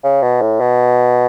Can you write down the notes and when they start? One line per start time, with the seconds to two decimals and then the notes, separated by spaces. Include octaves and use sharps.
0.03 C#3
0.22 B2
0.41 A2
0.60 B2